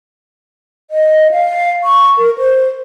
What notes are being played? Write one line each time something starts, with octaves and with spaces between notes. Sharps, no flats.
D#5
F5
C#6
A#4
C5